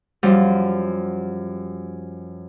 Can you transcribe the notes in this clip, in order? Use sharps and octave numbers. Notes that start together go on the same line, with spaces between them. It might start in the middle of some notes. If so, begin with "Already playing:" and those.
F#2 F3 G3